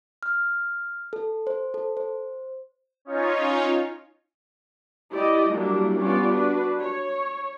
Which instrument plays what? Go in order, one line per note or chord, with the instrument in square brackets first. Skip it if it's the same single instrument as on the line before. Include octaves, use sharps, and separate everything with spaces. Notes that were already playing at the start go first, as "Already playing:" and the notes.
[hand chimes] F6
A4
C5
A4
C5
[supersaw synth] C#4 D#4 F4 C#5
[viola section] E4 G4 D5 D#5
F#3 G3 A#3 D4 E4
G3 B3 C#4 F4 D5
D4 F#4 B4
C#5